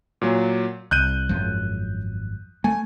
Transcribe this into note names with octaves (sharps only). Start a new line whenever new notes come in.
A#2 F#3
C2 F#6 G6 D#7
G#1 F#2 F3
A3 G#5